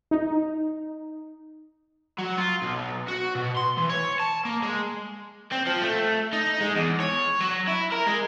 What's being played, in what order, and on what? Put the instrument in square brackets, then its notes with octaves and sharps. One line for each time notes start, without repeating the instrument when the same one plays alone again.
[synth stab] D#4
[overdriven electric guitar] F#3
F4
B1
F#4
B2
C6
E3
C#5
A5
A#3
G#3
C4
F3
A3
D#4
G#3
E2
C#5
F#3
E4
A#4
G#3